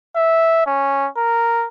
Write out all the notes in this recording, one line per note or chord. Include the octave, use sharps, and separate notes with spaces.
E5
C#4
A#4